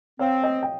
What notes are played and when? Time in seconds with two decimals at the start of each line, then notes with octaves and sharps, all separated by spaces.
0.19 C4 C#5 F5
0.43 D#5 G5
0.63 G5